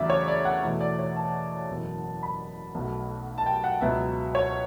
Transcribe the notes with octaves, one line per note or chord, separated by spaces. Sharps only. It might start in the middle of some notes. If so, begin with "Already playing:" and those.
Already playing: E2 C#3 F#3 A3 D5 E5
C#5
D5
F#5
E2 B2 A3 E5
D5
C#5
A5
F#1 E2 B2
B5
B1 B2 A3
A5
G5
F#5
C#2 B2 F#3 B3 E5
C#5